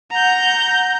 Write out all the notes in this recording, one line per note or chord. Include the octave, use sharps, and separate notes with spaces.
F#5 A#5 G6